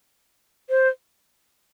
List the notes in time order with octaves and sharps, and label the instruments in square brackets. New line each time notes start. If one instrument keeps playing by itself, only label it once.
[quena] C5